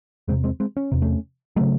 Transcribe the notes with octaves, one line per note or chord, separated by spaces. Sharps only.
E2 C3 G#3 C4
G#3 C4
G#3 C4
C#4
E2 C3
A3 C#4
C#3 F#3 A3